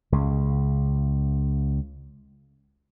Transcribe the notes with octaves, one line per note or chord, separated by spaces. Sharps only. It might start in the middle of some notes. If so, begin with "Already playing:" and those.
C#2 C#3